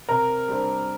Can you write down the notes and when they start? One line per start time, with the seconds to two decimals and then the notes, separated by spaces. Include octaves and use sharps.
0.09 C3 A#4
0.48 G3 D4 A4 C5